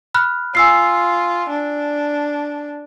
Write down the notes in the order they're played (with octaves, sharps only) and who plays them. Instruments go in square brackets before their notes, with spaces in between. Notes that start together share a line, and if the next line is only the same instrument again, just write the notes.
[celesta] B5 F6 F#6
[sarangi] F4 [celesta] G#5 E6 C7
[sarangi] D4